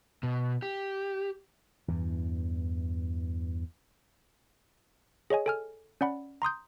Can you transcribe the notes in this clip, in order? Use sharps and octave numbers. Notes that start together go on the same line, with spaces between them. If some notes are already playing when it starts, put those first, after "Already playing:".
B2
G4
E2 G2 E3
G#4 C#5 D#5 G#5
A4 G#5 F6
C#4 D5 F#5 B5
A#5 C6 D#6 G6